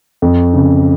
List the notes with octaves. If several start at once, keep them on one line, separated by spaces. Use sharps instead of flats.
F2
C#3